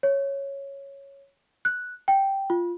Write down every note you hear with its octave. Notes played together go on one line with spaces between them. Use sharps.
C#5
F#6
G5
F4